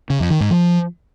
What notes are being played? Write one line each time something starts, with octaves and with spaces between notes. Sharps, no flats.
C#3
F2
D#3
G#2
F3